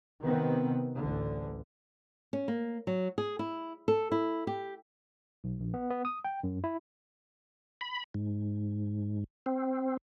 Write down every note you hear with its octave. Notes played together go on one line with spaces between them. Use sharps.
C3 D#3 B3 C4
A1 D2 D3
C#4
A#3
F#3
G#4
E4
A4
E4
G4
B1
A#1
B3
B3
D#6
G5
F#2
E4
B5
G#2
C4